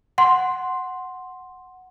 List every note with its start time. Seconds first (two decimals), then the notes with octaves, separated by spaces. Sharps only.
0.18 F#5 C6